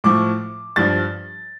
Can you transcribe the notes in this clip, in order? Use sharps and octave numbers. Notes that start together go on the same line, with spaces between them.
A2 F3 D6
G2 F3 A6